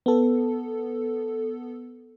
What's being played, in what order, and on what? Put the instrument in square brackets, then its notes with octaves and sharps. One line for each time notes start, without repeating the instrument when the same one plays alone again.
[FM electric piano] B3 A4